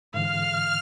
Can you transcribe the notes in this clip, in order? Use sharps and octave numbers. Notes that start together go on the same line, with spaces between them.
G#2 D3 E3 F5 F6